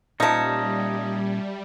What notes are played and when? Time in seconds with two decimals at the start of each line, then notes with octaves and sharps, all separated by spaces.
0.20 A#2 F3 G3 C#4 D#4 E5 A5